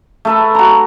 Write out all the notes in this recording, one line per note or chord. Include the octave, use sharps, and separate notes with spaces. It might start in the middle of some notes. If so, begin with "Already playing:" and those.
A3 A4 B4
F#4 A#5